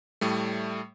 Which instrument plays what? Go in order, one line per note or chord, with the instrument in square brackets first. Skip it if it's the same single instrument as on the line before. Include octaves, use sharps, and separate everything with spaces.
[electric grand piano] A2 G3 A3